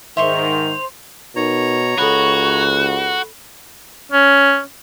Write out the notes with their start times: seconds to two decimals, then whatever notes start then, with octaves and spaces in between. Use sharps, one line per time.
0.17 G#2 D#3 C5 E5 C6 C#6 F7
1.36 B2 D#4 A#4 C#5 A#5
1.98 C#2 F#4 A4 B5
4.12 C#4